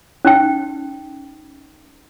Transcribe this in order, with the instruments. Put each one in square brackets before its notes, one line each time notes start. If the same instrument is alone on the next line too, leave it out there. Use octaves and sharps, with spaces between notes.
[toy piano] C#4 D#4 G5